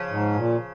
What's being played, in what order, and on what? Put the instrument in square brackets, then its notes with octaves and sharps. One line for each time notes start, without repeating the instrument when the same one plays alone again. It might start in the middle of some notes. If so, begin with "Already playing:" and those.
Already playing: [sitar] C#3 F3
[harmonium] G#2
A#2